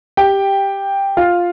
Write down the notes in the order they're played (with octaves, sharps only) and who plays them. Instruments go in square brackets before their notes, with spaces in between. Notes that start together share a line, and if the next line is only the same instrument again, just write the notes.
[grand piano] G4 G5
F4 F5